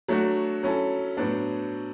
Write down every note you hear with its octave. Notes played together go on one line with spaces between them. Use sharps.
F#3 A3 D4 F#4
F#3 C#4 E4 A4
A2 F#3 B3 D4